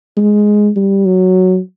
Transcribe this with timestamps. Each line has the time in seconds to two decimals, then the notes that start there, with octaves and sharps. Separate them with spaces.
0.17 G#3
0.76 G3
1.05 F#3